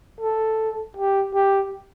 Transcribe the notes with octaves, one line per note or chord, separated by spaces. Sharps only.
A4
G4
G4